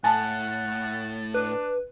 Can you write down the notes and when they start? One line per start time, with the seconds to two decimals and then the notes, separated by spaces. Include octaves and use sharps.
0.04 A2 F#5 G#5 A5 A6
1.34 D4 B4